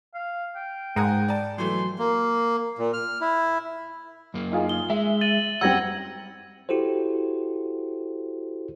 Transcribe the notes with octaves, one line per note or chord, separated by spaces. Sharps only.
F5
G5
G#2 G#3 A#4 F#5 G#5
D5 A5
E3 F#3 A3 C6
A#3
A#2
F6
E4
F#2 A#3
D#4 F4 G#4
G7
G#3 E5
A6 D#7 F#7
F#2 G3 C4 F#5 E6 G#6 A#6
E4 F#4 G4 A4 C5